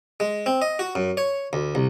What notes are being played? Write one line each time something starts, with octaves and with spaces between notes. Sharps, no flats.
G#3
C4
D#5
F#4
F#2
C#5
D2
C2